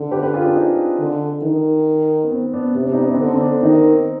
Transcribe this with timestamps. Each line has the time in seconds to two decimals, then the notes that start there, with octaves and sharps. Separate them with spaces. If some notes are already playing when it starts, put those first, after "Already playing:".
Already playing: D3
0.11 G4 B4
0.23 G4 B4
0.33 F4 G#4
0.44 D4 F4
0.55 C4 D#4
0.99 D3
1.43 D#3
2.23 B3
2.32 C4
2.53 B3 D4
2.75 C3 B3 D4
2.86 B3 D4
2.92 D#4
2.97 B3 D4
3.08 B3 D4
3.14 C4
3.19 D3 B3 D4
3.35 C4
3.41 B3 D4
3.63 D#3 C4 D#4